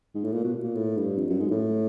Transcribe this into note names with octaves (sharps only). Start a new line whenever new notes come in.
G#2
A2
A#2
B2
A#2
A2
G2
F2
F#2
G#2
A2